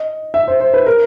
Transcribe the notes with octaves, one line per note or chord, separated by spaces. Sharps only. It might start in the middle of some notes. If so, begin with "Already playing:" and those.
Already playing: D#5
E5
C5
C5
B4
A#4